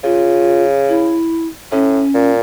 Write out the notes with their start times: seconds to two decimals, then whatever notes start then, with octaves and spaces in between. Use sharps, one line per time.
0.04 C#3 F4
0.89 E4
1.72 A2 C#4
2.14 A#2